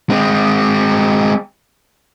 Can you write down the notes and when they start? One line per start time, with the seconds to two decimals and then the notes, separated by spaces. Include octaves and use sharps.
0.10 G#3 C4